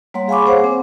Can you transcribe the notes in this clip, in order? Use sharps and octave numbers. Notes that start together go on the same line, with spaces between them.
G3 A#3 C#5 F#5 C6
G#4 F5 G#5 B5 C#6 D6
G#4 C5 C#5 F#5
C4